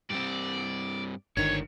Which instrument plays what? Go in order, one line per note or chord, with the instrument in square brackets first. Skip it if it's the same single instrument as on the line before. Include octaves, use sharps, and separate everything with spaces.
[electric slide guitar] G2 G3 C4 [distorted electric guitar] D5
[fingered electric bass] G1 D3 D#3 [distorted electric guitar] D2 G#2 [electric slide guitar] C#5 [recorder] G#6